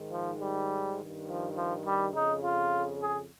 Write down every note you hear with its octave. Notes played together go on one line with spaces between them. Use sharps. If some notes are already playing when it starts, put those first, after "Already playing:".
Already playing: G#2 D#3
F3
G3
G2 D#3
F3
F3
G3
F2 C#3 D#4
F4
G#4